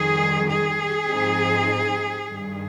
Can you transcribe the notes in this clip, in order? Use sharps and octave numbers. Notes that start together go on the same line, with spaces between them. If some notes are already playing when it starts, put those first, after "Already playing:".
Already playing: F2 D#3 G3 G#4
G#4
G#2 F3 C4 D#4
G2 D#3 G3